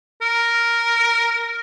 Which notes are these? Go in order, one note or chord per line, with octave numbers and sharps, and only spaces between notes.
A#4